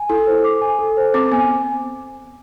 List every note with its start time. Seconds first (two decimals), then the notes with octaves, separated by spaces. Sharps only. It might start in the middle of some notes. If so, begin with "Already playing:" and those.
Already playing: G#5
0.09 E4 A4
0.27 C5
0.44 D6
0.62 G#5
0.79 A4
0.97 C5
1.14 C4 D6
1.32 B3 G#5